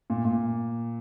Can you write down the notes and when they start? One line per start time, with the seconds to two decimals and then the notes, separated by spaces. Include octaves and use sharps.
0.10 A#2
0.25 A#2